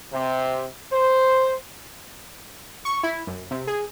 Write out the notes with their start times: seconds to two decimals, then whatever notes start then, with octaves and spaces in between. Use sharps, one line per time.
0.13 C3
0.91 C5
2.85 C#6
3.03 E4
3.27 F#2
3.51 C3
3.67 G#4